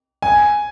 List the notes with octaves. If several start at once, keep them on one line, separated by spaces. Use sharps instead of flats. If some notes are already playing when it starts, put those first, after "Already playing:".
G#5